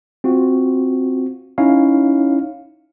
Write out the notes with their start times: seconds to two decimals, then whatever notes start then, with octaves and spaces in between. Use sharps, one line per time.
0.24 C4 F4 F#4
1.58 C#4 D#4 E4 C#5 F5